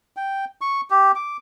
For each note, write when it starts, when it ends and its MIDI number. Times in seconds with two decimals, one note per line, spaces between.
0.17 0.45 79
0.61 0.81 85
0.90 1.12 67
1.15 1.37 86